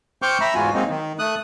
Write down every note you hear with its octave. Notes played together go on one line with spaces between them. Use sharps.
C5 G5 C#6 D6 F6 G6
E5 A#5 B5
E2 G#2 F4 F#4 G#5
F#3 G#3 A#3 C4 D#4
D#3
A3 D#6 F#6